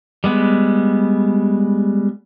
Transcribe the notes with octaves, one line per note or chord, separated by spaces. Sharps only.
G3 G#3 B3